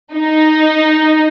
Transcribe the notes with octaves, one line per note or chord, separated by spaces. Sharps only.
D#4